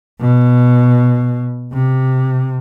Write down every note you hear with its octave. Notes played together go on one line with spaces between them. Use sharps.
B2
C3